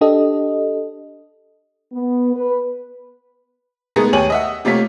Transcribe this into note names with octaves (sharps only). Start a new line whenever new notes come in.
D4 G4 A4 D#5
B3
B4
G#3 A3 B3 D#4 G#4 A#4
D#2 G4 C#5 G#5 D#7 F#7
D#5 E5 F#5
C3 A3 A#3 F4 C#5 B6